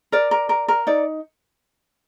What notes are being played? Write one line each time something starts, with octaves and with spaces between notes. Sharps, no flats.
A#4 D5
A#4
A#4
A#4
D#4 D5